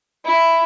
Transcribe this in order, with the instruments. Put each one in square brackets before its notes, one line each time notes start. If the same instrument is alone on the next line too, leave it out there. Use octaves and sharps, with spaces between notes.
[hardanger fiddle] E4